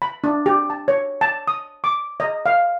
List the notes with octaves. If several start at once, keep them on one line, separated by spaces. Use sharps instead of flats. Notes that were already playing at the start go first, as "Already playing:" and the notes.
B5
D4
G4
A5
C#5
A5
D#6
D6
D#5
F5